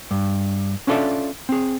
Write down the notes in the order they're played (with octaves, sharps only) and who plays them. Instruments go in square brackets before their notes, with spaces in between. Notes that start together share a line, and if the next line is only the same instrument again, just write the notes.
[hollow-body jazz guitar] G2
C#4 D4 F4 A4 D5 E5
C4 G#4